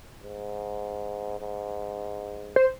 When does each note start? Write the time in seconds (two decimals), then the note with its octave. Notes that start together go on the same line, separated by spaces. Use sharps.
0.22 G#2
1.39 G#2
2.56 C5